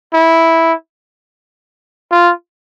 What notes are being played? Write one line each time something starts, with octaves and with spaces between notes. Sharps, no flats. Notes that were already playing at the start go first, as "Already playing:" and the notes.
E4
F4